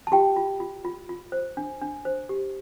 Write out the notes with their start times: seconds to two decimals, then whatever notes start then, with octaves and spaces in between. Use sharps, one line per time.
0.07 A5
0.12 F4 G4 G5
0.36 F4
0.60 F4
0.84 F4
1.09 F4
1.32 C5
1.57 D4
1.82 D4
2.05 C5
2.29 G4